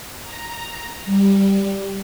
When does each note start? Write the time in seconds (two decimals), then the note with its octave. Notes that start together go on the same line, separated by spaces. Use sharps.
0.23 A#5
1.05 G3